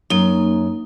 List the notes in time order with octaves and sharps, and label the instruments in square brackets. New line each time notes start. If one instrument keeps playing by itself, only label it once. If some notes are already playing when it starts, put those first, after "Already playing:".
[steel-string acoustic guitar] F#2 [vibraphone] A#3 D#4